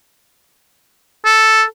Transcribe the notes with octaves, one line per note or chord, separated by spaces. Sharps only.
A4